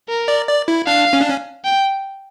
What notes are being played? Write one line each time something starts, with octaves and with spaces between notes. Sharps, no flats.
A#4
D5
D5
E4
D4 F5
C#4
D4
C#4
G5